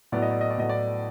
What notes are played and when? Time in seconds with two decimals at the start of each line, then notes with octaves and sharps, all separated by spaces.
0.12 A2 F#3 B3 D5
0.22 D#5
0.31 D5
0.41 D#5
0.50 D5
0.58 A2 F#3 B3 D#5
0.69 D5